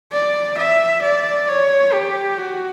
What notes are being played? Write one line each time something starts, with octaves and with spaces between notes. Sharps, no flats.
D5
E5
D5
C#5
G4
F#4